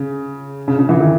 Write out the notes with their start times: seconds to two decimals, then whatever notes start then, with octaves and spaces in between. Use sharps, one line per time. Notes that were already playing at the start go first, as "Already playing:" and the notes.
Already playing: C#3
0.68 C#3
0.79 C#3
0.89 E3
1.00 D#3